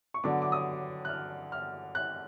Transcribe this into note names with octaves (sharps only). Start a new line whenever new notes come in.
C#6
D3 F#3 B3 D4 D6
D6
D#6
F#6
F6
F6
F#6